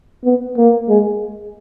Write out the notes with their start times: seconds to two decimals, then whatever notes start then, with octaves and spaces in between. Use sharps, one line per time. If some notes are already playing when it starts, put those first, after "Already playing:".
0.24 B3
0.58 A#3
0.89 G#3